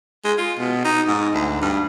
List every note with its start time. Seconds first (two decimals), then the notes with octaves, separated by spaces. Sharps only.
0.25 G#3
0.38 F4
0.59 B2
0.85 D#4
1.07 G#2
1.34 D2
1.62 G2